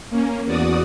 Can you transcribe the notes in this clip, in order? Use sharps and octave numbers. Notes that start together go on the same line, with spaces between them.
A#3 C#4
E2 F#4 D5 D#6